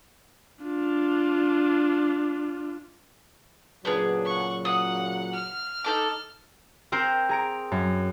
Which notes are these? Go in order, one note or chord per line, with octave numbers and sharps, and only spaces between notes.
D4 F4
A#2 C#3 F#3 B3 D4 G#4
F#5 C#6
F#5 D#6
F6
D#4 A4 D6
C4 A#4 C5
G#4 A#5 D7
F#2